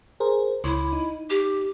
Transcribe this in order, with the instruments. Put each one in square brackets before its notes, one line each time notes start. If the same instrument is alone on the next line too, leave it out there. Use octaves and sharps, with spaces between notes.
[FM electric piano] G#4 A#4 C5
[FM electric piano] C#2 [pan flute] E4
[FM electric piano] D#4
[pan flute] G4